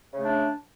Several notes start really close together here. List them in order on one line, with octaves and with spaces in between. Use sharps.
C#3 A3 D4